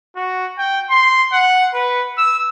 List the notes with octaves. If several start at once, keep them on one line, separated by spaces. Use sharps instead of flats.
F#4
G5
C6
F#5
B4
E6